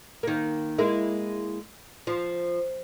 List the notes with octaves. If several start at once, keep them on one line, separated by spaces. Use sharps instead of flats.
D#3 A#3
G#3 A#3 E4
F3